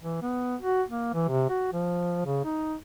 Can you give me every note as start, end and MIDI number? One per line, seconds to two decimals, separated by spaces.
0.01 0.21 52
0.22 0.56 59
0.62 0.82 66
0.89 1.09 58
1.14 1.25 52
1.28 1.45 48
1.49 1.69 66
1.73 2.22 53
2.26 2.40 49
2.45 2.75 63